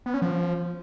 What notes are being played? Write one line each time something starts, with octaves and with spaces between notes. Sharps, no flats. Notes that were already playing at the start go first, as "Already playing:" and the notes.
B3
C#4
F3